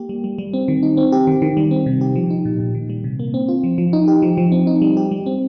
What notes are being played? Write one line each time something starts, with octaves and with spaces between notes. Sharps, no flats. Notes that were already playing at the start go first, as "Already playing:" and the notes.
Already playing: A#3 G4
G3
G3
G3
C4
D#3
D#4
C4
G4
D#3
D#3
G3
C4
C3
G4
F3
D#4
A#2
A#2
D#3
G3
C3
A#3
C4
F4
F3
F3
D#4
G4
F3
F3
C4
D#4
G3
G4
G3
C4